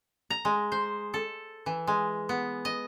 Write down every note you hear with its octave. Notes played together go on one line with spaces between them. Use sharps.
A#5
G#3
C5
A4
E3
G#3
B3
D#5